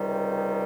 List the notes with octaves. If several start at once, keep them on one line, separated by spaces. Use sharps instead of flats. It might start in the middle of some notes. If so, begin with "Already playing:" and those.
Already playing: C#2 C3 D#3 G3